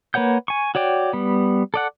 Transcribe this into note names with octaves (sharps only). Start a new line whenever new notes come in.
A#3 B4 C#5 F#5 G6
G#5 C#6
F#4 C#5 D5 G5
G3 B3
A4 D5 F#5